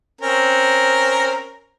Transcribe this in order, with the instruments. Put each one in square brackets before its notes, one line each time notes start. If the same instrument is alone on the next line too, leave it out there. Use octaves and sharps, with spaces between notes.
[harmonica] C4 C#4 A#4